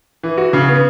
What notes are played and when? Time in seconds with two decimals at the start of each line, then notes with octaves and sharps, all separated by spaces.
0.23 E3
0.37 F#4
0.53 C#3
0.69 B3